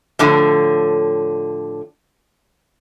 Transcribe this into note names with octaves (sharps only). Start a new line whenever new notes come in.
A2 D3 F3